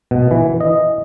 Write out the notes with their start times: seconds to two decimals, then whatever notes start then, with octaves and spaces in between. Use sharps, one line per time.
0.11 B2
0.31 E3
0.61 D#5